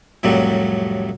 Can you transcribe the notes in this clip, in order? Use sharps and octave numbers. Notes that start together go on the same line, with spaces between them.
C2 F2 A2 F#3 G3